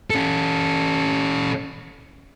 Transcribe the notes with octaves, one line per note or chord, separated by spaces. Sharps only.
C#4 A4